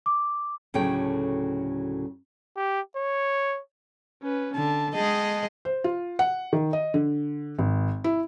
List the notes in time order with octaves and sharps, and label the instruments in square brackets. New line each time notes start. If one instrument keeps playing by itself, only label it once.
[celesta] D6
[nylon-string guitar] D2 A2 C#3 F#3 G5
[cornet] G4
C#5
[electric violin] C#4 B4
[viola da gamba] D3 [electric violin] A5
[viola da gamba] G#3 G#4 D#5 [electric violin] G5 A5
[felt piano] C5
F4
F#5
D#3
D#5
D3
G#1
E4